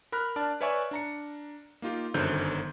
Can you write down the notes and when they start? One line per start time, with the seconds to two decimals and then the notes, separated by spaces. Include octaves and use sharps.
0.12 A#4 B5 F6 F#6
0.36 D4 D5 A5 F6
0.61 B4 C#5 D5 E5 G#5 C#6
0.91 D4 A#5 C#7
1.82 A#3 D#4 F4 G4
2.14 G1 F#2 D3 D#3 C5 G6